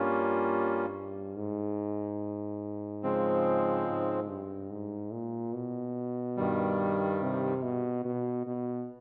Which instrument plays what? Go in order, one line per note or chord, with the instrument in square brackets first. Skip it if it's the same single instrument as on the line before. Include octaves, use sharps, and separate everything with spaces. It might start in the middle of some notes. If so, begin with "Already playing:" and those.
Already playing: [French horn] G2 [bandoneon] G3 A#3 C#4 F4
[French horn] G#2
[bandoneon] C#3 F3 G#3 C4
[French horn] G#2
G2
G#2
A#2
B2
[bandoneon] G2 D#3 G3
[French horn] C3
B2
B2
B2